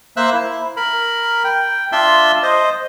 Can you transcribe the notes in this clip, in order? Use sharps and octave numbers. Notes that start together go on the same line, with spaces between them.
A#3 C5 E5 E6 F#6
E4
A#4 B5
G5
D4 F4 E5 C6 E6
C5 D#5